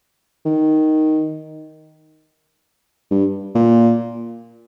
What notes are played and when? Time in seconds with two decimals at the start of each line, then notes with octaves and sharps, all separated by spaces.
0.45 D#3
3.11 G2
3.55 A#2